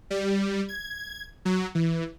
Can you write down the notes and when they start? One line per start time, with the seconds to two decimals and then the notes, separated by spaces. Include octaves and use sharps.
0.10 G3
0.69 G#6
1.45 F#3
1.75 E3